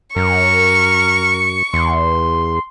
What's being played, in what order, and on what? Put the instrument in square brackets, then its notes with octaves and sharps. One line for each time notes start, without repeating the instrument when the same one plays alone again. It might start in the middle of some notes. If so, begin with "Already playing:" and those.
[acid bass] F#2 [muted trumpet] A#4 [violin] C#6
[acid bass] E2 [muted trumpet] C6